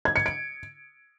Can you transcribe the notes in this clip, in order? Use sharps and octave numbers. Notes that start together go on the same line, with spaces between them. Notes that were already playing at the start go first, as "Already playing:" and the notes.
G#6
C#7
D7